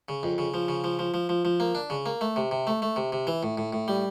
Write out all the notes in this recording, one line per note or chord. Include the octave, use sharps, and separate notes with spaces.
C#3
F2
C#3
F3
C#3
F3
F3
F3
F3
F3
A#3
D4
C#3
A#3
A3
C3
C3
A3
A3
C3
C3
E3
A2
A2
A2
G3